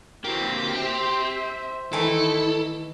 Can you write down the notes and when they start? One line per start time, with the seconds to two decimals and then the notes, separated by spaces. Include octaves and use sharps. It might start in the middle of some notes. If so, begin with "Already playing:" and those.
0.24 A#3 C4 E4 F#4 G4
0.76 C5 E5 G5
1.93 D#3 E3 A3 D#4 E4 A4